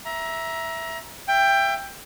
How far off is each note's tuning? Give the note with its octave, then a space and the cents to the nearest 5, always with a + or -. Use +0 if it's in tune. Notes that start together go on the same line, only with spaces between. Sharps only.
E5 +0 A#5 +25
E5 +25 G5 +15